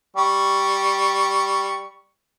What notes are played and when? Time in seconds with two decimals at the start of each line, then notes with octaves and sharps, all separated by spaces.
0.17 G3 C#6